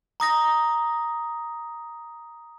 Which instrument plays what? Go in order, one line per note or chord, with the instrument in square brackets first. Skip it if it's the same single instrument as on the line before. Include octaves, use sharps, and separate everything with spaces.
[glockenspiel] A#5 D#6 A#6